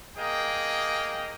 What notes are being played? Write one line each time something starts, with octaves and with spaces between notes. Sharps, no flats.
A#3 G#4 D#5 G5